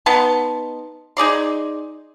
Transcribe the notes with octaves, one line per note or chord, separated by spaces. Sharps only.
B3 D#4 A5 C6
D#4 G#4 D5 C6